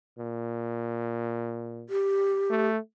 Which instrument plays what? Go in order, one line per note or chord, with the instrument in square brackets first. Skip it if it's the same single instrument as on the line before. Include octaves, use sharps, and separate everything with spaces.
[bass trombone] A#2
[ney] G4
[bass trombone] A3